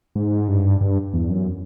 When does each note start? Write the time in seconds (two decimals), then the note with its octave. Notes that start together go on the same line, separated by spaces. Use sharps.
0.15 G#2
0.48 G2
0.81 G2
1.14 E2
1.30 F#2